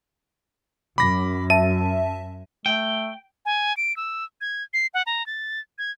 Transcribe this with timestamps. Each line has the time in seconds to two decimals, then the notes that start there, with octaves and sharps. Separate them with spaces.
0.98 F#2 B5 D6 A#6
1.50 E5 A5 D#7
2.66 A3 G5
3.46 G#5
3.77 D7
3.97 E6
4.41 G#6
4.74 C7
4.94 F#5
5.06 A#5
5.27 A6
5.78 G#6